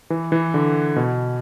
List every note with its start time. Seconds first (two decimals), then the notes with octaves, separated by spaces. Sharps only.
0.10 E3
0.32 E3
0.54 D3
0.96 B2